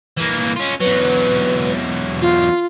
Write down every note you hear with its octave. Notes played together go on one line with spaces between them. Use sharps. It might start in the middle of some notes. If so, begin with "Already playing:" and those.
E3 A#3
C#4 F4
E2 F#3 B4
F4